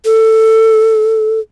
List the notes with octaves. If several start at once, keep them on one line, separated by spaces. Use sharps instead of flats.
A4